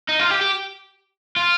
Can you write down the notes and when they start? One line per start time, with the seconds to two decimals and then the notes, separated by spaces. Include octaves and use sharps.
0.09 D#4
0.19 F4
0.30 G4
0.41 G4
1.36 F4